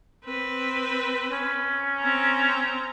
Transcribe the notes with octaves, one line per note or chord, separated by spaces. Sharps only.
C4 B4
C#4
C4 A#5